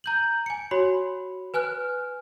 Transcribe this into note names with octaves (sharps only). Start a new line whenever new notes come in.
A#5 G6 F#7
G#5 C#7
F#4 C#5 B5
B4 G#5 F6 F#6